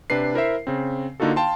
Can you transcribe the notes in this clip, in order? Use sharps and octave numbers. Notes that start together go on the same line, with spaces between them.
C3 D4 B4 C7
E4 A#4 C5 E5
C#3 C4
D3 A#3 D#4 F4 F#4 A4
F5 G5 A5 C6